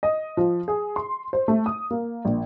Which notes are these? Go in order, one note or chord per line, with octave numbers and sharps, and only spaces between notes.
D#5
F3
G#4
C6
C5
A3
D#6
A#3
A#1